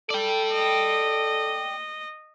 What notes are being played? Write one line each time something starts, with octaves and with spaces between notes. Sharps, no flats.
A4 D5 G5
D#5